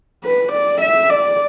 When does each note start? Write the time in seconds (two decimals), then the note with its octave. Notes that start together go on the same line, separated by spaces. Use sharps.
0.24 B4
0.52 D5
0.81 E5
1.10 D5